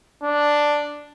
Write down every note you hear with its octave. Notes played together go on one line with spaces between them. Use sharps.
D4